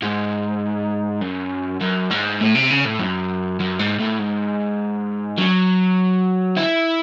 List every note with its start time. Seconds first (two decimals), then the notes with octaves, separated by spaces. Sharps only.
0.02 G#2
1.21 F#2
1.81 F#2
2.11 G#2
2.40 A2
2.55 C3
2.70 C#3
2.85 A2
3.00 F#2
3.60 F#2
3.79 G#2
3.99 A2
4.19 G#2
5.38 F#3
6.56 E4